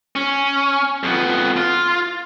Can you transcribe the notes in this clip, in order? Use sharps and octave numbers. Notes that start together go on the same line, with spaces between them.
C#4
F2 B3
F4